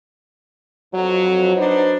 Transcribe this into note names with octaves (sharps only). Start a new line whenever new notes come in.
F2 F#3
F#3 D4 D#4 B4 C5